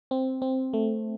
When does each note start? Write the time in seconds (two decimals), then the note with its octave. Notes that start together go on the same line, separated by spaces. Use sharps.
0.11 C4
0.42 C4
0.73 A3